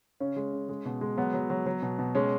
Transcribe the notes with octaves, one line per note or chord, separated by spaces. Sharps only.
C#3 C#4
G#3
C#3
G#3
B2
G#3
F#3 B3
F#3
F#3
F#3
B2
B2
G#3 C#4